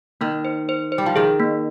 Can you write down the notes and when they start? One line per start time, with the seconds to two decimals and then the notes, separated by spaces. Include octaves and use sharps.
0.21 D#3 A#3
0.45 C5
0.69 C5
0.92 C5
0.98 G3
1.06 F3
1.16 D#3 G#4
1.40 A#3